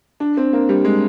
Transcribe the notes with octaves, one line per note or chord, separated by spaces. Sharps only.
D4
C4
A#3
G3
G#3